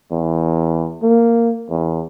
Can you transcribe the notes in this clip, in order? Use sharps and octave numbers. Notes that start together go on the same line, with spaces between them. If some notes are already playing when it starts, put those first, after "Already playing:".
E2
A#3
E2